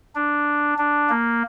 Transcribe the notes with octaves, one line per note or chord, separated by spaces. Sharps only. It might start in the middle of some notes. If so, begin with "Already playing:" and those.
D4
D4
A#3